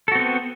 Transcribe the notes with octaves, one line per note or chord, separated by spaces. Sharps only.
B3 C4 F#4 A4